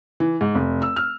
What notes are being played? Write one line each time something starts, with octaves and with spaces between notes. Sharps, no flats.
E3
G#2
F1
E6
F6